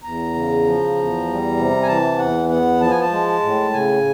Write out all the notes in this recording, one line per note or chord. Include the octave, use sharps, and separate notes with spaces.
E2 A#5
C#3
F3
E2
G3
C3
G#5
E3 A5
E2 F#5
B3 F#5
F3 A5
G#5
A5
G#3
A2
C#3 G#5